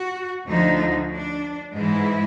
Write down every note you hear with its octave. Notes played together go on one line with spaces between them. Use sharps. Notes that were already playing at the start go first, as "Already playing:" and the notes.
Already playing: F#4
D2 D3 F3 A3 D#4
D4
G#2 E3 G#3 E4